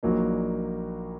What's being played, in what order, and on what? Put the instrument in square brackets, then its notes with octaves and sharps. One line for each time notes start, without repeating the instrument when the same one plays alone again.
[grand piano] A#1 A#2 F#3 A#3 D#4